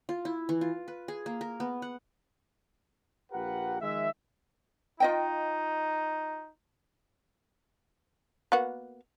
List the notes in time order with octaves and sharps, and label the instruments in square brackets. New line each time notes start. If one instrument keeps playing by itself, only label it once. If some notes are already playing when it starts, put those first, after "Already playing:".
[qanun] F4
E4
E3
F4
B4
G#4
A#3
A#4
B3
F#5
[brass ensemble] A#1 F4 G4 A#4 B4 F#5
D#3 F3 G#3 E5
[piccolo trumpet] D#4 [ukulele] F4 D#5 G5
[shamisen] A#3 B3 F#4